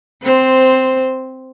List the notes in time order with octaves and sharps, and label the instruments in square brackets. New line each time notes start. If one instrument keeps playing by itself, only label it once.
[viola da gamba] C4 C5